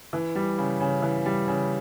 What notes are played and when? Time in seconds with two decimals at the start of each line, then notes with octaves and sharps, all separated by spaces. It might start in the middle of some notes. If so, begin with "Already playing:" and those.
0.13 E3
0.35 G3
0.58 C#3
0.80 C#3
1.02 E3
1.26 G3
1.48 C#3